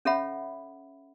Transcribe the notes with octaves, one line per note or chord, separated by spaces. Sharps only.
C#4 A4 C#5 E5 F#5 B5